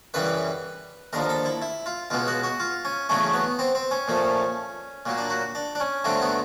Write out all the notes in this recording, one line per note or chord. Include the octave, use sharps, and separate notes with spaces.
F#2 C#3 E3 G3 B4
D#2 D3 F3 A#4
A4
E4
E4
F4
C#2 B2 G#3 B3 F4
F#4
F#4
F4
C#4
E2 C#3 F#3 A3 C#4
B3
C4
C4
C#4
A#2 F3 A3
A#2 F#3 A#3
D4
F#4
D4
D4
C#4
G2 D3 F#3 A3 C4
B3